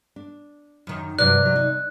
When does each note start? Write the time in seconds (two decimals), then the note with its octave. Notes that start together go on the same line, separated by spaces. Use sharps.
0.16 D4
0.87 F#2 D#3
1.19 G2 C3 F#3 D5 F#6
1.42 D#3 F#3
1.56 D#4